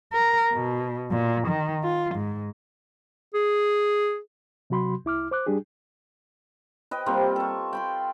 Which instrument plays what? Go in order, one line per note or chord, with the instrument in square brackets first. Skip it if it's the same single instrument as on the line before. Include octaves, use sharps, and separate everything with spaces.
[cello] A#4
B2
A#2
D#3
F4
G#2
[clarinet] G#4
[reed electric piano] C3 F#3 F#4 B5 C6
C2 E4 D6 F6
C5 D6 F#6
G3 D4 G4 G#4
[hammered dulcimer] B4 D#5 G5
G3 A#3 C4 F4
A4 C#6
G5 B5 C6